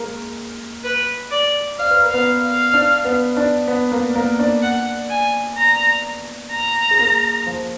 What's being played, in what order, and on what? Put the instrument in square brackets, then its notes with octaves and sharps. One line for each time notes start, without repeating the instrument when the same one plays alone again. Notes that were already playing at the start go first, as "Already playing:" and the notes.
Already playing: [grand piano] G#3 A#3 A#4
[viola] B4
D5
[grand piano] D5 [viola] F5
[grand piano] B4
A#4
[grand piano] B3 B4 [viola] F5
[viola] F5
[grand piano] D4 D5
B3 B4
D4 D5
B3 B4
A#3 A#4
A#3 A#4
D4 D5
[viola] F#5
G#5
A#5
A#5
[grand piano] G#4
A#3 A#4
F3 F4